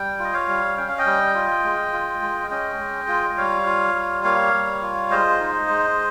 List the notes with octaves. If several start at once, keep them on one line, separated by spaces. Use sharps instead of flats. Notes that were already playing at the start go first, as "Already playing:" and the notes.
Already playing: G3 G5
F4 D#5
C#5 F5
G3
C#4 G5
F5
D#5 G5
G3
F4
G#3
F4
G#3
C#4 D#5 G5
G#3
F4
D#5
G3 C#5 F5
F4
G3
A#3 C#5 F5
G3
F4
G#3 C5 D#5
D#4
G#3